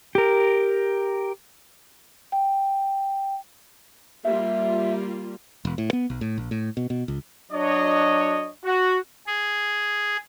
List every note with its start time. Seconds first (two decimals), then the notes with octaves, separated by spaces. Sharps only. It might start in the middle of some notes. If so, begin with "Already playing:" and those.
0.15 G4 A#4
2.32 G5
4.25 G3 A#3 F4 E5
5.65 E1
5.78 A2
5.93 B3
6.10 B1
6.21 A2
6.38 A#1
6.51 A2
6.77 B2
6.90 B2
7.08 C#2
7.52 F#3 D4 C#5 D#5
8.65 F#4
9.27 G#4